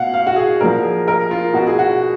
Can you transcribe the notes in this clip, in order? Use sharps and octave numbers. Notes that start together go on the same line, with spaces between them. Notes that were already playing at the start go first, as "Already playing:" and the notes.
Already playing: B2 F5 F#5
F5
F#4
G#4
A#2 F3 A#4
G#4
A#4
F4
B2 F#4
G#4
F#4